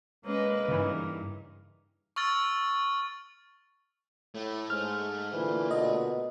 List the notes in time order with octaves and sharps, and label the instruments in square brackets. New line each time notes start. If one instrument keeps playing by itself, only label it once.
[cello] G#3 [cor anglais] A#3 [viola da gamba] C#4 B4 D#5
[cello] G2 [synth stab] C#3 E3 [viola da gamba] D#4
[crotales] C#6 E6 F6 A6
[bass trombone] A2 [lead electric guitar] A3
[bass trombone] G#2 [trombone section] G#3 [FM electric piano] F6
[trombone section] A#2 D3 [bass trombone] E3
[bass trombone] B2 [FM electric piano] D#5